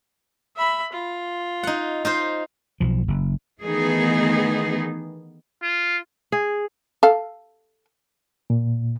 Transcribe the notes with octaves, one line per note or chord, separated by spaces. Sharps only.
E5 B5
F4
D#4 F#5
D#4 F4 C5
B1 F3
F#1
D#3 E3 A3 B3 D#4 G#4
F4
G#4
A4 F5
A#2